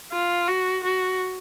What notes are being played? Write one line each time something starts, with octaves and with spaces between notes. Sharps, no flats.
F4
F#4
F#4